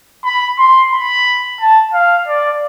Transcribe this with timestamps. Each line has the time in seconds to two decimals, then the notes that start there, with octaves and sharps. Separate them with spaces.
0.24 B5
0.58 C6
0.92 B5
1.60 A5
1.94 F5
2.27 D5